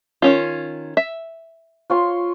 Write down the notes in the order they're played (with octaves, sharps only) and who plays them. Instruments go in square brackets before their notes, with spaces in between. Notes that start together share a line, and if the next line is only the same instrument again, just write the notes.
[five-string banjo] D#3 C#4 F4
E5
[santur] F4 C#5 C6